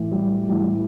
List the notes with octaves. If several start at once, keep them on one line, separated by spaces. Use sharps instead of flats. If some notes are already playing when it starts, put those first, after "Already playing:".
Already playing: A2 E3
G3
A2 E3 G3